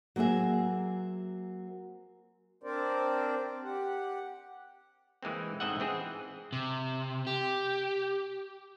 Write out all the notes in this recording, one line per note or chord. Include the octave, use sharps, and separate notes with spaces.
F#3 A#3 C4 G#4 E5
C4 D4 A#4 C5 D5
G4 F#5
E3 G#3 A#3 C4
A1 G#2 C4 D#5 E5 F#5
E3 C4 G#4
C3
G4